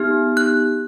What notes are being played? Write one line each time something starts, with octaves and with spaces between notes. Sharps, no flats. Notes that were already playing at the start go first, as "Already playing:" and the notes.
Already playing: B3 D#4 G4 F6
F#6